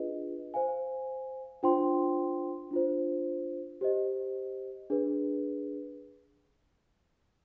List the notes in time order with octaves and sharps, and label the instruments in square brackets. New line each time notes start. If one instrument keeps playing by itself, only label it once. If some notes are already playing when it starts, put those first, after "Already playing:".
Already playing: [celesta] D4 F4 G#4 B4 D#5
C5 F5 G#5
D4 F4 C5 G5 C6
D4 F4 C5
G4 C5 D#5
D4 G#4 B4